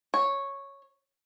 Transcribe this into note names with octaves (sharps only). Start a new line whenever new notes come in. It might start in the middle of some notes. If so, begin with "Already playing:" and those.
C#5